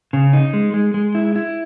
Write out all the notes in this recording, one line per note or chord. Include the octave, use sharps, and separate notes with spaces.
C#3
D#4
G#3
G#3
G#3
E4
E4